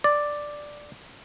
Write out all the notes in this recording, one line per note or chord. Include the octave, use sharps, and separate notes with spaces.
D5